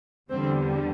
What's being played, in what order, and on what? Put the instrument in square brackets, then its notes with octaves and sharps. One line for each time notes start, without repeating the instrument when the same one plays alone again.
[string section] E2 D3 G3 C4